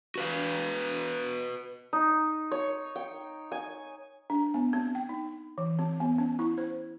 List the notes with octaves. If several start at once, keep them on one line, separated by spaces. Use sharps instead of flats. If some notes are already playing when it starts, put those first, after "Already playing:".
F#4 B4 F5
D#4
C#5
G5
G#5
D4
B3
C4
G5
D#4
E3
C4
B3
C#4
E4
C5